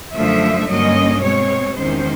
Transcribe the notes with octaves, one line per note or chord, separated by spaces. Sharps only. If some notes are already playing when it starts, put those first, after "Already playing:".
F#2 D3 F3 A3 E5
G2 D3 F#3 A#3 C#4 D#5
B2 G#3 C4 C#5
E2 C3 D#3 G#3 C#4 C5